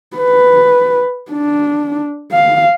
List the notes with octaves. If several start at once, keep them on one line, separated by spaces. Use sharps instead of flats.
B4
D4
F5